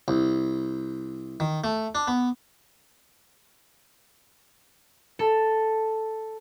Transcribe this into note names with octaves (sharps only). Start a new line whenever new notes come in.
C2
D#3
A3
D4
B3
A4